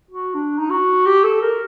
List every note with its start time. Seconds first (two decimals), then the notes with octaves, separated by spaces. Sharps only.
0.11 F#4
0.35 D4
0.59 D#4
0.70 F#4
1.06 G4
1.24 A4
1.42 A#4